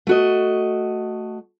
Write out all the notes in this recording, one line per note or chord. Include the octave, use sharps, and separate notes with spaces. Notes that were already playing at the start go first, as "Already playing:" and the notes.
A3 F#4 D#5